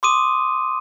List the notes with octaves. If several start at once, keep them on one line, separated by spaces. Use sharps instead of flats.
C6 D6 D#6 D#7